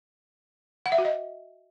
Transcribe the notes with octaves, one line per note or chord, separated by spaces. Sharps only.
F#5
E5
F#4
D#5